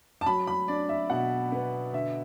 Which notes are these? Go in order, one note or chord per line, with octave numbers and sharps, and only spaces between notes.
A5
F#3 B5
B5
D4 D5
E5
B2 F#5
B3
D3 E5